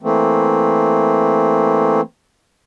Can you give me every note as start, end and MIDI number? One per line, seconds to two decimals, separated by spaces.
0.02 2.01 52
0.02 2.01 57
0.02 2.01 58
0.02 2.01 60